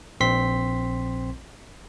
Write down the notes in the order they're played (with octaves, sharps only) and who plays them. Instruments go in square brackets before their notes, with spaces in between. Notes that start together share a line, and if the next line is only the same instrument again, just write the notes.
[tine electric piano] A#1 C4 C6 B6